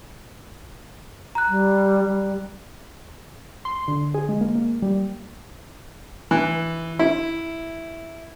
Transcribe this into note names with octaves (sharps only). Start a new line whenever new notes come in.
A#5 F#6
G3
G3
C6
D3
G#4
G#3
A#3
A#3
G3
E3
E4